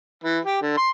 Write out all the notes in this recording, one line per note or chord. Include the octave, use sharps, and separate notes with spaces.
E3
G4
D3
C6